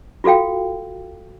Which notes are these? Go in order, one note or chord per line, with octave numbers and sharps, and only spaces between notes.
F4 F#4 A4 F5 G5